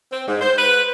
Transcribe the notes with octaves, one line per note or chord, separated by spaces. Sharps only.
C4
G#2
C5
B4